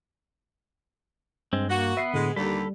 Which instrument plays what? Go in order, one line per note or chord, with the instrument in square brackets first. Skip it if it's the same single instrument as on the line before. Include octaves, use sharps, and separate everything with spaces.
[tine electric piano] G2 [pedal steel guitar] G#3 C4
[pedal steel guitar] A#3 [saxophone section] F#4
[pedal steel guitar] B3 B4 [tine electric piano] E5 C7
[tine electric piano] A2 D3 [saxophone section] G#3
[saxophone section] D#2 D3 [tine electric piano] G3 [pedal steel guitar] A4 B5